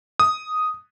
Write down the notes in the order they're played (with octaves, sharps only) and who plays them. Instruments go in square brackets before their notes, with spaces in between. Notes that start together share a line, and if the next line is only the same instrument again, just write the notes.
[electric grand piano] D#6